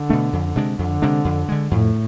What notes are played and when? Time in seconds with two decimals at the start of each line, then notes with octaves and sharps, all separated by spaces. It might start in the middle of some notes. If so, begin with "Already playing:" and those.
Already playing: D3
0.09 B2 A3 D4
0.33 F2
0.56 C3 G#3 D4
0.79 F2 D3
1.02 C3 G#3 D4
1.25 F2
1.49 D3 G#3
1.71 F2 A2